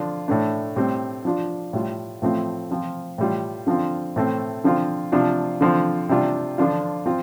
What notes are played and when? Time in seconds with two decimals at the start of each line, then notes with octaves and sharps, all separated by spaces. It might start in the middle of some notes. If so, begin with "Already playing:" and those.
Already playing: D3 F3 D4 F4
0.28 A2 A3 D4
0.76 A2 G3 C4
1.25 F3 D4 F4
1.73 A2 G3 F4
2.22 A2 F3 A3 C4 F4
2.71 F3 C4 F4
3.18 A2 G3 F4
3.67 D3 F3 C4 F4
4.16 A2 A3 C4
4.64 D3 F3 C4 F4
5.12 C3 F3 D4 F4
5.61 D3 F3 C4 F4
6.09 C3 G3 D4 F4
6.58 D3 F3 D4 F4
7.06 F3 C4 F4